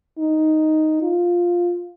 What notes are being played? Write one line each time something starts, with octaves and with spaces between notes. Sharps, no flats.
D#4
F4